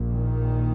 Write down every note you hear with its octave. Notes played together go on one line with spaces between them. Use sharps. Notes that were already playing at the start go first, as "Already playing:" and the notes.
Already playing: A#1 A#2
D#3